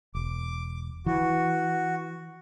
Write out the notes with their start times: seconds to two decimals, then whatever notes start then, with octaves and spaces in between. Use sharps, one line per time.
0.15 E1 D6
1.06 E3 F#4